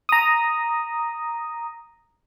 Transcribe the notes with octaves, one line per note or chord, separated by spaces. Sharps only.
A#5 D#6